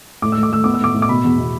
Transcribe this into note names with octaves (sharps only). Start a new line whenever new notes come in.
A2 D6
E6
A3
D6
A3 E6
B3 D6
E6
A2 D6
A2
D6
B2 B5
E2
B2